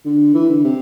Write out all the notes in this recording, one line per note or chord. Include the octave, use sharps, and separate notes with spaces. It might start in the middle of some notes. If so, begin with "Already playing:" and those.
D3
E3
D3
C3